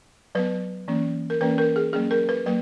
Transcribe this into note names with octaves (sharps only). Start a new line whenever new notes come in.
F#3 B3 B4
E3 A#3 C#4
A#4
E3 A#3 C#4 B4
A#4
G#4
F#3 A#3 C#4 G#4
A#4
B4
F#3 A#3 B4